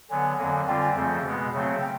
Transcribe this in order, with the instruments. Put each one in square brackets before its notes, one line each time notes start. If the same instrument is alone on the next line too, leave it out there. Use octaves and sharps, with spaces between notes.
[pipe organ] D3 F#3 B3 [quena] G#5
[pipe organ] F2 D3 F#3 A#3
[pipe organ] D3 G3 C4 F4 [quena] G5
[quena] G#5
[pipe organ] F2 C#3 F3 A3 C4
B2 G#3 B3
C#3 F#3 A3 C4
[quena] G5